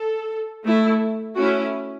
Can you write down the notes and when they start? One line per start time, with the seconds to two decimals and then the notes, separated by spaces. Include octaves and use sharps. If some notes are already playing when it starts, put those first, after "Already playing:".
Already playing: A4
0.63 A3 E4
1.35 A3 C#4 E4 F#4